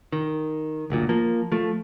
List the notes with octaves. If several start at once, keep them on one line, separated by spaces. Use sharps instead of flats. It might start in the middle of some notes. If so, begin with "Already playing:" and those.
D#3
F#1 D2 A#2
F3 A#3
F3 A3